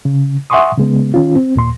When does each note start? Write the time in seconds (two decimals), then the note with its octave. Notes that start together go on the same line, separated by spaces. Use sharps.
0.05 C#3
0.50 E5 F#5 G#5 C6 C#6 D#6
0.78 C#3 G#3 B3
1.14 D#3 C#4 F4
1.35 C4
1.56 D#2 A#2 C6